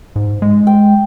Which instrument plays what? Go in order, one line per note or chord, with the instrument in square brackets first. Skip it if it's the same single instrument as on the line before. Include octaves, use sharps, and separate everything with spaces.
[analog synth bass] G#2
G#3
[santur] G5